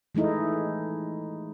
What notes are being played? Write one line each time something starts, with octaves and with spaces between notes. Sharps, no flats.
E3 G#3 A3 D#4 E4